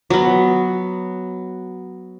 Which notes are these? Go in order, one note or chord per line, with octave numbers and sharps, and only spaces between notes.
F#3 B3